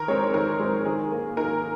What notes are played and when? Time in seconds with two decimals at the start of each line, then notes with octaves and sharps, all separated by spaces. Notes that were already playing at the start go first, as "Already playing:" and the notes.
Already playing: D#3 A#4
0.08 G#3 C4 C#5
0.34 D#3 A#4
0.60 G#3 C4
0.85 D#3 G#4
1.12 A#3
1.37 D#3 A#4